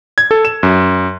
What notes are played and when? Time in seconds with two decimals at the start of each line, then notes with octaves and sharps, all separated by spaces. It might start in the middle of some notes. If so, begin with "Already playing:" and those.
0.18 G#6
0.31 A4
0.45 E7
0.63 F#2